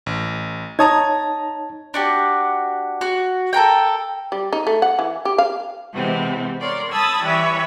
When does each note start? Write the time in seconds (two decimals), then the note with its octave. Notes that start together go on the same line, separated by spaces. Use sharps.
0.06 A1
0.79 D#4 C#5 A5 A#5 D#6 G#6
1.94 D4 F#4 G4
3.01 F#4
3.53 A4 A#4 F#5 G5
4.32 G3
4.53 D#4
4.67 A3
4.82 F#5
4.99 E3
5.25 G4
5.38 F5
5.93 C3 E3 G#3 B3 C4
6.61 A#4 C#5 D5 C6
6.90 A5 B5 D#6 E6 G#6 A6
7.23 E3 G3 B4 C#5 E5